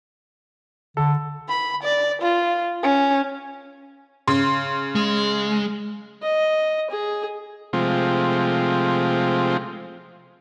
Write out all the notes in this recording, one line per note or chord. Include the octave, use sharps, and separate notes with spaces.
D3 A4
B5
D5
F4
C#4
C#3 C6
G#3
D#5
G#4
C3 F3 G#3 A3 C4 F4